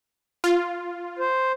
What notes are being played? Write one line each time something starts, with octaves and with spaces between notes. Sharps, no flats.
F4
C5